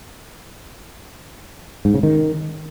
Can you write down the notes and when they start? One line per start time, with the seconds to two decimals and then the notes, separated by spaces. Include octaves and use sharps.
1.85 G#2
1.94 C#3
2.03 D#3